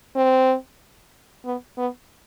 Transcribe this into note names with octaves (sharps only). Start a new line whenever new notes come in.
C4
B3
B3